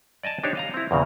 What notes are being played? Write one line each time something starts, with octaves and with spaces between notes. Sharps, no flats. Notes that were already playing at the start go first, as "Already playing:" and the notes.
D5 D#5 G#5 A5
D4 D#4 G4 C5 C#5
D#5 F5 A#5
C4 E4
E2 A#2 C#3